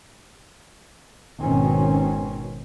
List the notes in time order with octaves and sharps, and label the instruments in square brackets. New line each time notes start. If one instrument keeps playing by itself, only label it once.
[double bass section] G#1 B2 D#3 C4 C#4